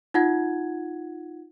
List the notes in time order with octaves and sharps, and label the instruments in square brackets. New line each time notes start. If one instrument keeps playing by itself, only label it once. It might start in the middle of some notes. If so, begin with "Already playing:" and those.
[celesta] D#4 F4 F#5 G#6